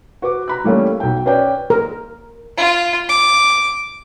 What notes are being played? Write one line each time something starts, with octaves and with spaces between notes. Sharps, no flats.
F#4 B4 D6
A#5 B5 F#6
E3 G3 A3 A#3 C#4
B1 G5
C#4 B4 D5 G5
A#4
F4
D6